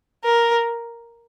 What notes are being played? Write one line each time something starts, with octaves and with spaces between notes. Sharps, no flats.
A#4